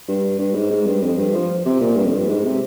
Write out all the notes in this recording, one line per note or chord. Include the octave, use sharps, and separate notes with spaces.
G2
G2
G#2
G#2
G2
F2
G2
F3
C3
A#2
G2
F2
G2
G#2
C3